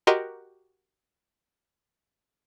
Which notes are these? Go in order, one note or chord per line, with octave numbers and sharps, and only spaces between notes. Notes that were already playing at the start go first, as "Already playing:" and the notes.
F#4 G4 A#4 D#5 C6